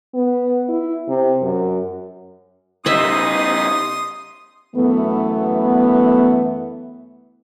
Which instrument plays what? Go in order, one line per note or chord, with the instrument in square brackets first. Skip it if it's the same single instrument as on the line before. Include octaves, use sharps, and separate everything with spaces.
[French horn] B3
E4
C3
F#2
[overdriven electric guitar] C#3 G3 [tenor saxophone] D#4 [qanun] D#5 E5 [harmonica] C6 D#6
[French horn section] F#2 E3 A3 B3